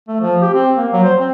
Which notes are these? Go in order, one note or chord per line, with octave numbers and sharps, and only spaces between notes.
A3
F3
G4
C4
A#3
F#3
C5
C4